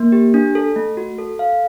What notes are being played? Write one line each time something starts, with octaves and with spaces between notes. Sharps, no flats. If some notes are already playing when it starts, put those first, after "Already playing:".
Already playing: A#3
G4
D4
A4
A3
F#4
A4
F5